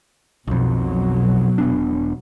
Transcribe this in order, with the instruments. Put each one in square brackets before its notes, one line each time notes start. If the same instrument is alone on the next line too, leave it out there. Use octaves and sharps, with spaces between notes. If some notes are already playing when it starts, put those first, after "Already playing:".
[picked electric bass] B1 F2 [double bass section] B2 F#3
[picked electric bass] E1 B3 D4